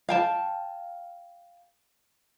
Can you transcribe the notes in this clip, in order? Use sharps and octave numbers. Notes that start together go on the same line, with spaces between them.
F5 G5 A5